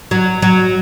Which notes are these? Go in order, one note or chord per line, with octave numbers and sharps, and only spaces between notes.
F#3
F#3